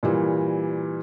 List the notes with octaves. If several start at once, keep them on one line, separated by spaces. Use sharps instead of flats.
A#2 E3 G3